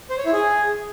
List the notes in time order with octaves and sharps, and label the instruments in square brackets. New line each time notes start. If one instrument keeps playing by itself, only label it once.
[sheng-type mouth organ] C5
C#5
E4
G#4